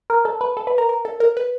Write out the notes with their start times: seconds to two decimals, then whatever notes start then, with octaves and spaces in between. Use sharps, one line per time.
0.10 A#4
0.25 A4
0.41 B4
0.57 A4
0.67 B4
0.78 A#4
0.89 A#4
1.05 A4
1.20 A#4
1.37 B4